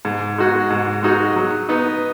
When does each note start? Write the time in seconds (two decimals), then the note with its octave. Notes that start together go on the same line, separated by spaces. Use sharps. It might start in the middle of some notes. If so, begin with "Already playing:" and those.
0.05 G#2
0.38 G#3 D#4 F#4
0.70 G#2
1.03 G#3 D#4 F#4
1.36 F#3
1.69 B3 D#4